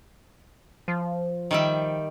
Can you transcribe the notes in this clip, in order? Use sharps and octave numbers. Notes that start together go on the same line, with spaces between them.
F3
D#3 G3 E5